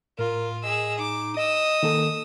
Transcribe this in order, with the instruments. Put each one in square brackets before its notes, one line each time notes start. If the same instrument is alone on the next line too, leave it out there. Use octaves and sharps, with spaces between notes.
[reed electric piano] A2 [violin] F4 [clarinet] A#4
[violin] G#4 E6 [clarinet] D#5
[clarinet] D#4 [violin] D6
[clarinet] D#5 [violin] D#6 E6
[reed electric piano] D#3 A#3 A4